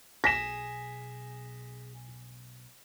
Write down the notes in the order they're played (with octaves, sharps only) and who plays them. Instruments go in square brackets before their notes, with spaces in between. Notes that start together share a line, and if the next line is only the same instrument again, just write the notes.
[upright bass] B1 B2 [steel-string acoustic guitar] G#4 [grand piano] A#6 B6 E7